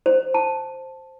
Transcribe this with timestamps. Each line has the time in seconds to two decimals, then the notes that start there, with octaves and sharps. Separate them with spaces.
0.06 C5
0.34 A5